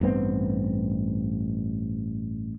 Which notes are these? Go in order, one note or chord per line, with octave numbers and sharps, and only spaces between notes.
A1 G2 B3 C4